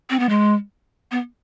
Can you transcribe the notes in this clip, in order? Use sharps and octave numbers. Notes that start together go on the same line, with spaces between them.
C4
B3
G#3
B3